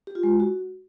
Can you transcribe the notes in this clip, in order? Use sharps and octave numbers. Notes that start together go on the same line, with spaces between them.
G4
F4
G#3
E4
F#4